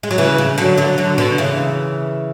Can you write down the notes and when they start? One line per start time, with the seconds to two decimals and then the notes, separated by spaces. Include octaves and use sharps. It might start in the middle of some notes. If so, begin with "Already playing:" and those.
0.03 G#3
0.11 F#3
0.18 C#3 E3
0.38 C#3
0.58 D3 F#3
0.78 D3 F#3
0.98 D3 F#3
1.18 B2 D3
1.38 C#3 E3